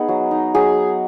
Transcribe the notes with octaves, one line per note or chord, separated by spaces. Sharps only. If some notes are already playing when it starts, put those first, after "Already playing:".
Already playing: B3 D#4 G#4
F#3
D#4
F#3 G#4